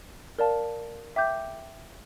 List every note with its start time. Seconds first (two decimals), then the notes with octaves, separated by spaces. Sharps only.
0.38 A#4 D5 F5 A5
1.16 E5 G5 D6 G6